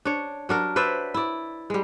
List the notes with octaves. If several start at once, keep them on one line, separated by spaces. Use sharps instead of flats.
D4 C#5
F#3 D4 A#4
B4 C5 D5 E5
E4 D5
G3 G#3